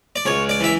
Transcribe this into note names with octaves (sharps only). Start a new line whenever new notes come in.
D5
C#2 C#5
D5
E3 E5